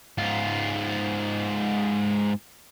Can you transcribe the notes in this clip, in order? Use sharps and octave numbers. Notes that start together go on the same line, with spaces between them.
G#2 F4